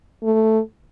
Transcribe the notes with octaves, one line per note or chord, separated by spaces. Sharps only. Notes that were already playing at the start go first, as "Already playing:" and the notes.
A3